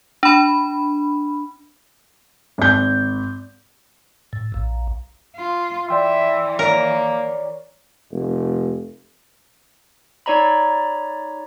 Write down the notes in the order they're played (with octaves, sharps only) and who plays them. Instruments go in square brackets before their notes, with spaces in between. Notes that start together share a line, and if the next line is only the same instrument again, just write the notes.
[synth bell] D4 B5
[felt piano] G#1 G6
[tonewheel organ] A2
A#1
[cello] F4
[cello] E3 [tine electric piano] D5 G5 C6 [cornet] E5
[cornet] A#3 [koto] A#4 [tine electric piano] C#5 D5
[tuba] F1
[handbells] D#4 C#5 D5 A#5 B5